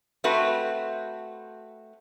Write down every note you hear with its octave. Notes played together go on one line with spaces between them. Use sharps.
A3 C4 F#4 B4